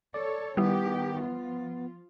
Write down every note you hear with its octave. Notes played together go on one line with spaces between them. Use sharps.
A4 C#5 D5
D#3 G3 B3 E4 G4
F3 F4